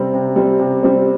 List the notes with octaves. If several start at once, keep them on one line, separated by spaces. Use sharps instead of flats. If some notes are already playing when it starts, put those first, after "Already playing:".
Already playing: C3 G3 C4
C3
G3 C4
C3
G3 C4